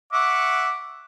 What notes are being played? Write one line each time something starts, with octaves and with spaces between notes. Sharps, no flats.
E5 F#5 C#6 D6